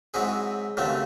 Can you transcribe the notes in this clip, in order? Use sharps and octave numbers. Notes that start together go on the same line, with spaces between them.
G#2 F#3 C4 E4 G#4
D#2 C#3 F#3 A3 C4